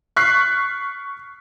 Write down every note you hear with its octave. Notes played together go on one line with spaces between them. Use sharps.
C#6 F6 F#6 B6 C7